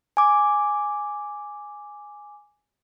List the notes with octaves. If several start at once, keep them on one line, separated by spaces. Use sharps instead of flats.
G#5 D6